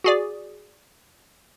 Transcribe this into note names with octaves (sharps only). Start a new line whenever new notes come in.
F#4 G#4 D5